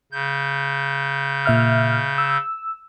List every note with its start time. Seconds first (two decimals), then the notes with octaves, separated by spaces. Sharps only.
0.12 C#3 G6
1.46 A#2 E5 F6
2.18 E6